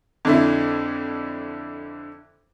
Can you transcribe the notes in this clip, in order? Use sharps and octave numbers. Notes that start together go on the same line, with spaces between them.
F2 D3 E4